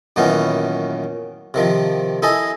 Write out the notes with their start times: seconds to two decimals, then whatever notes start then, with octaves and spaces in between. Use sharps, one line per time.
0.16 F#2 A#2 D#3 E3 B3 C#4
1.54 C3 D#3 F3
2.22 D#4 E4 A4 D#5 G#5